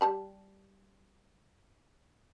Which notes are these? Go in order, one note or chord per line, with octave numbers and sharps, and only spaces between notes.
G3 A5 B5